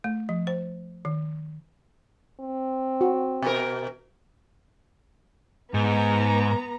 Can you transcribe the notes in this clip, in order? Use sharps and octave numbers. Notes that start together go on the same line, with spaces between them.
A3
F3
C5
D#3
C4
F#4
B2 A#4
G#2 B3 A#5